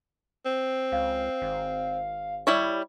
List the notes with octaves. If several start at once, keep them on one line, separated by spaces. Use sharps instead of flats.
C4
C#2 F5
G#1
G3 E4 C#5